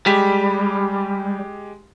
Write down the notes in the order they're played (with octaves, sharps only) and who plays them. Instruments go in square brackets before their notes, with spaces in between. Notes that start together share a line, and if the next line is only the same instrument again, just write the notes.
[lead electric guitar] G3 [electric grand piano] G#3 G4 B6